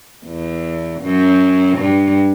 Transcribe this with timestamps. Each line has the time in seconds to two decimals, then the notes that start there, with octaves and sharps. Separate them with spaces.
0.26 E2
1.02 F#2
1.78 G2